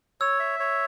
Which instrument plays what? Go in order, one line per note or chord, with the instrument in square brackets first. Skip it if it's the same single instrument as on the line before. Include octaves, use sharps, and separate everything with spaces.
[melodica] C#5 [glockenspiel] E6
[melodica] E5
C#5